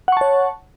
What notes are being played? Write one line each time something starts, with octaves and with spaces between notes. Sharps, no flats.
C#5 F#5 A5 C#6